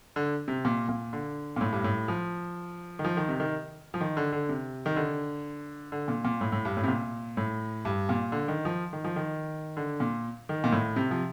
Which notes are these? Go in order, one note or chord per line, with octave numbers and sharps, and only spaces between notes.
D3
C3
A#2
A#2
D3
A#2
A2
G2
A2
F3
D#3
F3
D#3
C3
D#3
F3
D#3
D3
D3
C3
D#3
D3
D3
A#2
A#2
A2
A2
G2
A2
C3
A#2
A2
G2
A#2
D3
D#3
F3
D#3
F3
D#3
D3
A#2
D#3
A#2
A2
C3
F3